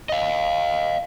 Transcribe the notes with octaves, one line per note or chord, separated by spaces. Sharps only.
D#5 F5